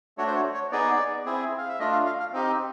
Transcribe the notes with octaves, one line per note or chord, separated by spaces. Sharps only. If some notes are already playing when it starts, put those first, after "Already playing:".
A3 D4 F#4 C#5
C5
C#5
C#5
B3 D#4 G#4 D5
C4 E4 G#4
F5
E5
A3 D4 F4 D#5
F5
F5
F5
C4 D#4 G4